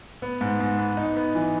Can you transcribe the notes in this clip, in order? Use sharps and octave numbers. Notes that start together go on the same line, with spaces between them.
B3
G#2
G#2
B3
D#4
B3
E3